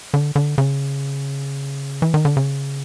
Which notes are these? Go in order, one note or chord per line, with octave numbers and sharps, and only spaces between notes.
D3
D3
C#3
E3
D#3
D3
C#3